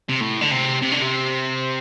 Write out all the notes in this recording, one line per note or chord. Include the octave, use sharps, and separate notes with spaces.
C3
A2
D3
C3
C3
D3
C3